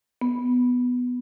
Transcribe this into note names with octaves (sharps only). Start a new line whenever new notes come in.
B3